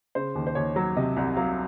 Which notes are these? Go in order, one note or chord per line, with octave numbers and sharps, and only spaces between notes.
C#3 C5
D#2
C5
D#2 C#5
F#3
C3 D#5
C2
F#3 F5